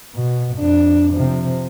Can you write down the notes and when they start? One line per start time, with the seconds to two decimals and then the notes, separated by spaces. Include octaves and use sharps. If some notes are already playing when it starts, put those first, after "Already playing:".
0.16 B2
0.57 F2 D4
1.14 C3 F3